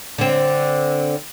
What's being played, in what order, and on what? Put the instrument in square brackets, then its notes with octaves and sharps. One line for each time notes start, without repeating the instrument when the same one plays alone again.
[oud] D3 C4